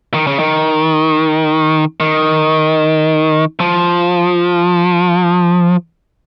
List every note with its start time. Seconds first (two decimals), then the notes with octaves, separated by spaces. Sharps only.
0.14 D#3
0.27 C#3
0.39 D#3
2.00 D#3
3.60 F3